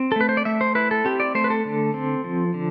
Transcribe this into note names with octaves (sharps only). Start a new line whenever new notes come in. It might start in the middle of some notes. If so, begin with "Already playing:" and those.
Already playing: C4
A4
A3 B4
C5
D5
A3 E5
C5
E4 B4
A4
C4 G4
D5
A3 C5
B4
A4
D3
C4
F3
D3